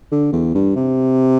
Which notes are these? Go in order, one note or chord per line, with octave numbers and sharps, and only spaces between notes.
D3
E2
G2
C3